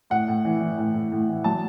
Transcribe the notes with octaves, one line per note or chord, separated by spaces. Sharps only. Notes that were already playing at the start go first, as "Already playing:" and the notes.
A2 F#5
A2
E3
E3
A2
A2
A2
E3
F#3 A5